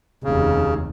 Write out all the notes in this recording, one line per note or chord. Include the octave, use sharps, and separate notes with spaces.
F1 D#2 C#3